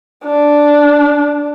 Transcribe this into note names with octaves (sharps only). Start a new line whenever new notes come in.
D4